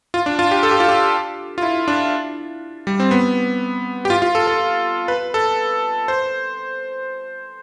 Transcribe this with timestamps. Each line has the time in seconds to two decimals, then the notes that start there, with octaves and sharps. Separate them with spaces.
0.14 F4
0.26 D4
0.39 F4
0.51 G4
0.63 A4
0.71 G4
0.80 F4
0.89 G4
1.58 F4
1.62 E4
1.88 D4
2.87 G3
3.00 C4
3.11 B3
4.05 G4
4.10 F4
4.22 F4
4.35 A4
4.47 A4
5.08 B4
5.34 A4
6.08 C5